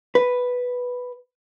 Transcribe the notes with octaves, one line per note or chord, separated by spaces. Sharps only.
B4